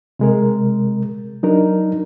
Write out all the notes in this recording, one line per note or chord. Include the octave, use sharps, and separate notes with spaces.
C3 G#3 A#4
F#3 D4 D#4 A#4